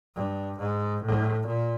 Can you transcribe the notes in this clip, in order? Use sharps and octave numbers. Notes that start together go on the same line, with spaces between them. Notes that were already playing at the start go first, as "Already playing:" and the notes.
G2
G#2
A2
A#2